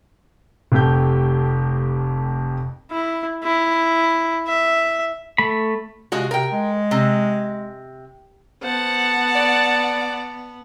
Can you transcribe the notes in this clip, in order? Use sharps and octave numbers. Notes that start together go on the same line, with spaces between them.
F1 F2 A3 G4 G6
E4
E4
E5
A3 B5
C3 G#3 F4 F#4
C3 A#4 G5
G#3
C3
B3 C5 F#5 A5
D5